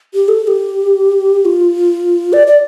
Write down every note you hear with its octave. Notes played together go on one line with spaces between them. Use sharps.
G4
A4
A4
G4
F4
D5
D5